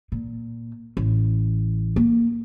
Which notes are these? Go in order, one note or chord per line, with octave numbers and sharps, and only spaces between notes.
A#2
A1
A#3